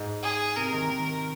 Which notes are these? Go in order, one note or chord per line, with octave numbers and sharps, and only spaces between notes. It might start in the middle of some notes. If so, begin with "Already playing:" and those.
Already playing: G#2
G#4
C3 A#4
D#3
D#3